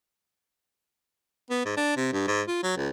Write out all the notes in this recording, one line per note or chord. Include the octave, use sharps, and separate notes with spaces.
B3
G#2
D4
C3
G2
G#2
F4
F#3
C#2